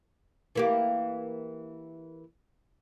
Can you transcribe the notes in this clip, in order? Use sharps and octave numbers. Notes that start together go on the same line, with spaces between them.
E3 A#3 G4